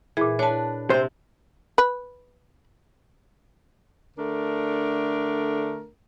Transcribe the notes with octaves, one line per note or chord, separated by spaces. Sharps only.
A#2 E3 G#4
D4 B4 C#5 A5
C3 C4 C5
B4
D3 A3 D4 A#4